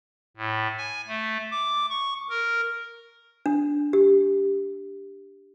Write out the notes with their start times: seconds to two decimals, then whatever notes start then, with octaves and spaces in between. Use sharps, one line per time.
0.37 A2
0.77 G#5
1.08 A3
1.51 D6
1.90 C#6
2.30 A#4
3.46 D4
3.93 G4